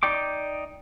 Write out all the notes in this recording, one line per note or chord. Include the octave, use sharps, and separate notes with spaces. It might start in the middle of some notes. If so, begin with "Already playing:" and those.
D#4 D5 G5 D6